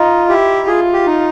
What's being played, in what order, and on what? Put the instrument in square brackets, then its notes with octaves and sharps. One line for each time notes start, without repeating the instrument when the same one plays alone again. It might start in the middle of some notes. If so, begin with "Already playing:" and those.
Already playing: [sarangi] D#4 [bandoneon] F4
[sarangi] E4 [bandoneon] G4
[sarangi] F4 [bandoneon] G#4
[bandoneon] G4
D#4